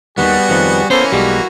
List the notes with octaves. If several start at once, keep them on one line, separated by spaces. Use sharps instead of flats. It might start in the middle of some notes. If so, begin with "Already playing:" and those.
D#2 D#3 G3 B3 F#4 G#4 F#5
F2 D#3 F3
E3 A#3 B3 C#4 A4 C5
B1 G3 G#3 F#4